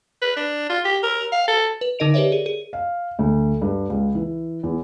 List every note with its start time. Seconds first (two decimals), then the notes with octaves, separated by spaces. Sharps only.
0.22 B4
0.36 D4
0.69 F4
0.85 G4
1.03 A#4
1.32 F5
1.48 A4
1.81 B4
1.99 D3 D#4 A#4 D#5 D7 F7
2.14 G4 A#4 B4 C#5 D5 E5
2.32 G#4
2.46 G#4
2.73 F5
3.19 D2
3.62 G2
3.90 C#2
4.15 E3
4.63 E2